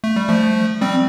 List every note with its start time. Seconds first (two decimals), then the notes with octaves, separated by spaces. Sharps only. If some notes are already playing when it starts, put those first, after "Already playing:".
0.04 A3
0.16 G3
0.29 F3 A3
0.81 G3 C4